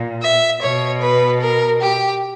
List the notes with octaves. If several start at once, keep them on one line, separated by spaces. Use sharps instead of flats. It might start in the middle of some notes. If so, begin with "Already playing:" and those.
Already playing: A#2
E5
B2 C#5
B4
A#4
G4